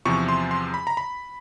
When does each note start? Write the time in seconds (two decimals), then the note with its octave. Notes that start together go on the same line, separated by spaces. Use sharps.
0.05 E2 C3 F3 C#6
0.28 C6
0.51 C6
0.74 B5
0.87 A#5
0.97 B5